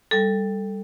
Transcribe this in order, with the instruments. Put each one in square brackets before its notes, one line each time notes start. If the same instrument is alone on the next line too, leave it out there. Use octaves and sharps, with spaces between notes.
[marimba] G3 A4